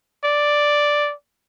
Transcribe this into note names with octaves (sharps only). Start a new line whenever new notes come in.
D5